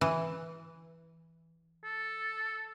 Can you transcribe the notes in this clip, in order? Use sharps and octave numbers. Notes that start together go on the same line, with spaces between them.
E3
A4